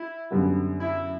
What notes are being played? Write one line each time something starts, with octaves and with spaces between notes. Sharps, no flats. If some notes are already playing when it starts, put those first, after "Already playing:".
Already playing: E4
F#2 D3 G3 B3
E4